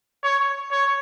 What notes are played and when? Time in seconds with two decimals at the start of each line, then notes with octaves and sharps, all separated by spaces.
0.23 C#5
0.71 C#5